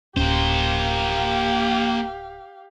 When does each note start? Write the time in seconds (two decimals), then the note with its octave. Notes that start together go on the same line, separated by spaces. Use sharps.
0.17 D1 A#3 C#4 G4 C5 F5